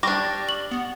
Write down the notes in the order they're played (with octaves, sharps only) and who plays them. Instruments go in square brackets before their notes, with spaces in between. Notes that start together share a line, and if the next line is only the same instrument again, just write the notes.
[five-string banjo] G3 D4 [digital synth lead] C#6 [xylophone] D6 A#6
[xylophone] F#7
[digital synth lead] B3